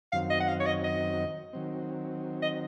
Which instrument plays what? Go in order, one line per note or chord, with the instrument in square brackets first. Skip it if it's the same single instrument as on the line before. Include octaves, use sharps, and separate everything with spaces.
[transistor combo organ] F#2 D#3 F#3 C4 [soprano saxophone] F5
[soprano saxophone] D#5
F#5
F5
C#5
D#5
D#5
[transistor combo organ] D#3 F#3 C4
[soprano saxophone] D#5